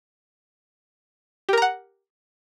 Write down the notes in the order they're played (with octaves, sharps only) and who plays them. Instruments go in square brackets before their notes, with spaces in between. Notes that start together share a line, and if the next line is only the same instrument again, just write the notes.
[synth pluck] G4
A#4
A#5
F#5